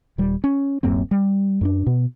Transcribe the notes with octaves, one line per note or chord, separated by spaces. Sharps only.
D#1 G3
C#4
D1 F#2 A#3 C4
G3
F#2 C#4 D4
B2 B3